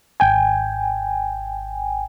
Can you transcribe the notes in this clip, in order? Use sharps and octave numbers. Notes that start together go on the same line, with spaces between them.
G#1 G5 G#5